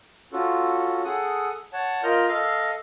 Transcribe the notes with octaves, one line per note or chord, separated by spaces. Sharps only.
C#4 F4 F#4 A4
G#4 A4 F#5 D#6
C#5 F#5 A5
F4 A#4 D#5 F6 G6
A4 D#5 F5